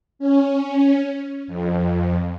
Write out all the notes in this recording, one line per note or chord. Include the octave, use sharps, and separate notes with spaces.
C#4
F2